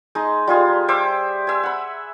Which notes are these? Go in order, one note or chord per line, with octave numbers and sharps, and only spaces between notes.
G#3 D#4
G3 F4 G#4
C5 E5 D6
E5 G#5
F#5 B5